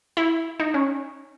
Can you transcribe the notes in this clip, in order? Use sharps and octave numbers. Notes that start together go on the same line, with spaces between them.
E4
D#4
C#4